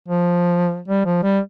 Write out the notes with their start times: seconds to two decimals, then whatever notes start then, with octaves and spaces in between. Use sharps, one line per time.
0.08 F3
0.88 G3
1.06 F3
1.23 G3